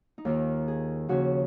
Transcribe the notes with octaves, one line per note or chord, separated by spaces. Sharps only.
D#4
D#2 D#3 F4
G#4
D#2 C#3 F3 F#4